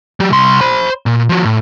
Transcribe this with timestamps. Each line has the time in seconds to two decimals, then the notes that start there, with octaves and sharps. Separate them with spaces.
0.20 F#3 G4
0.32 C2 C6
0.61 C5 B5
1.06 A#2
1.29 F3 F#4
1.45 A2